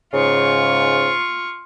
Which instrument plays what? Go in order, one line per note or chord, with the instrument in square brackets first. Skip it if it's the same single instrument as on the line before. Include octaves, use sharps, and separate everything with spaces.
[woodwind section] G#2 C#3 [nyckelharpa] F4 C#6